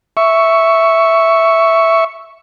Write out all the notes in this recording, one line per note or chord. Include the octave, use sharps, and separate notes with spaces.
E5 C#6